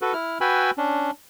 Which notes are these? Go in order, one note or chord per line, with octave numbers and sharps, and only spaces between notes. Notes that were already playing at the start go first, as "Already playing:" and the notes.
F#4 A4 B4
E4 F6
F#4 B4 G5 G#5 B5 E6
C#4 D4